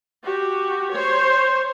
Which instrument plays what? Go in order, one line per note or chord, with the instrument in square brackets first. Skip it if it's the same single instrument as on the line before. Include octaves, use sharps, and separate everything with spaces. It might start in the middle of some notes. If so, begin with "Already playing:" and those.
[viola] F#4 G4
C5 C#5